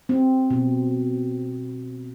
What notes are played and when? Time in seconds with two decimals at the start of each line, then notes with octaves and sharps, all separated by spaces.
0.09 C4
0.50 B2